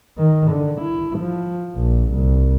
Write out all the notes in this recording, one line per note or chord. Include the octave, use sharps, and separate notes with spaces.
D#3
D3
E4
F3
A#1
C2